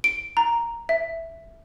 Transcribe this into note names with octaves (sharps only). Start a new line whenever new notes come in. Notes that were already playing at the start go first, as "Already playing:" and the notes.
D7
A#5
E5